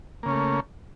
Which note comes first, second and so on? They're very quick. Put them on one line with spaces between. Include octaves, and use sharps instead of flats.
A#3 C#3 C#4 A3